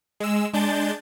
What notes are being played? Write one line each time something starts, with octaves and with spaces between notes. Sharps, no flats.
G#3 E6
G#3 D4 G6 A6